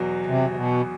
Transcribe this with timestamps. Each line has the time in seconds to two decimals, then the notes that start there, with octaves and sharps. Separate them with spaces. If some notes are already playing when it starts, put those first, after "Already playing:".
Already playing: E2 B2 F#3
0.26 C3
0.50 C3
0.55 B2